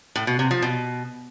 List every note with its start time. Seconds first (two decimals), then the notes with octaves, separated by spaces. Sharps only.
0.16 A2
0.27 B2
0.39 C3
0.51 F3
0.62 B2